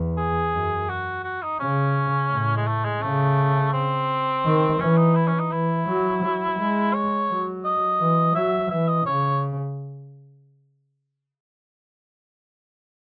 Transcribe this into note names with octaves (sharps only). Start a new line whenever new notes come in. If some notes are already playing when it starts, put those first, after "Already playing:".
Already playing: E2
G#4
F#2
F#4
F#4
D#4
C#3 C#4
A2
G#3
A3
G#3
C#3 A3
C4
D#3
E3 C#4
D#4
E4
C#4
D#4
E3 E4
F#3
F#3
G#3
C#5
F#3
D#5
E3
F#3 E5
E3 E5
D#5
C#3 C#5